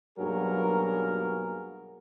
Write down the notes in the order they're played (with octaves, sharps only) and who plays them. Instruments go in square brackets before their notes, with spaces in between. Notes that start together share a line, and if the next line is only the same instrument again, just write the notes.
[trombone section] B1 G2 F#3 A#3 G#4 A#4